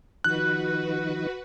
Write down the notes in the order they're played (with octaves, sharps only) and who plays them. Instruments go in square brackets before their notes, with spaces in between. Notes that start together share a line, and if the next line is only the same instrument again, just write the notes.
[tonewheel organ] D#3 F3 D#4 [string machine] F#4 B4 [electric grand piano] F#6